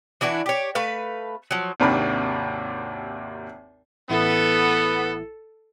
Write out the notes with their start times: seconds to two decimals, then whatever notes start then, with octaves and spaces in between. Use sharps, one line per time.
0.21 E3 D4 E4 F#4
0.46 G4 C#5
0.75 A3 B4 F5
1.51 F3 F#3
1.80 G#1 D#2 C3 D#3 D4 B5
4.10 A1 B3 E4 A4